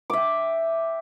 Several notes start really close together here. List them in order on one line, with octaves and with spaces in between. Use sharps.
D6 E5 G5